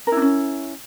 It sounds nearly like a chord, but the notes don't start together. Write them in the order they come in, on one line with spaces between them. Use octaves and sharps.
A#4 E4 D4 C#4